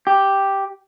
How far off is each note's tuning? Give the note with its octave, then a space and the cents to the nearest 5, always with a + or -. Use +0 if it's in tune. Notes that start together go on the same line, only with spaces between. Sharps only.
G4 +0